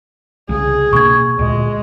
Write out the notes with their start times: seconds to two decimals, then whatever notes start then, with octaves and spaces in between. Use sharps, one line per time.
0.49 C2 C#3 G#4
0.93 B2 A#3 D4 C#6 G#6
1.39 D2 A#2 G#3